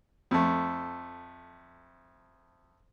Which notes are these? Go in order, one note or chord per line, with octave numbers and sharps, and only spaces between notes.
F2 A3